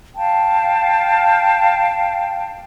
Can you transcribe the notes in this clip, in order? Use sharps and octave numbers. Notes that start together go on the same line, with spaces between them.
F5 G5 A5